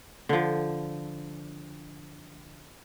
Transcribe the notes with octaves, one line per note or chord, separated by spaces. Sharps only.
D3 F3